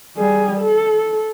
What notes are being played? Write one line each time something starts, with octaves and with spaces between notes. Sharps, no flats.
G3 G#4
A4